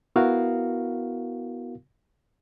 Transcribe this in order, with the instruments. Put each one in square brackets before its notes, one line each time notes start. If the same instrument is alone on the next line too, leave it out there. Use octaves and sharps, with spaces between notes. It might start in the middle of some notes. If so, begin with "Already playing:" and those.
[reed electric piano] B3 E4 F#4 A#4 F5